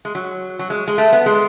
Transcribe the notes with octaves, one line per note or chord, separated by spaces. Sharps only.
G#3
F#3
F#3
G#3
G#3
A3
B3
G#3